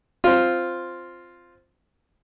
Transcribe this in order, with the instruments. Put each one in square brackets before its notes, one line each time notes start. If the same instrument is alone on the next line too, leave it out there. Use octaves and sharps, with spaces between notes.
[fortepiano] C4 F4